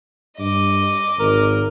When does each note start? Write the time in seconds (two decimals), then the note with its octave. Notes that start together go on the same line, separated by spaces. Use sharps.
0.39 G2 D#5 D6
1.20 G#1 A#4